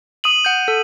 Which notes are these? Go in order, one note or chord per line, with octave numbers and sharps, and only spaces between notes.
D#6 D#7 F#7
F#5 G6
A4